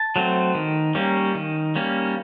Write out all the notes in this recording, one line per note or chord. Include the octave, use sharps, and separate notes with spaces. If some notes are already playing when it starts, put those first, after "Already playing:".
Already playing: A5
F#3 A3 C4
D#3
G3 A#3 C#4
D#3
G3 A#3 C#4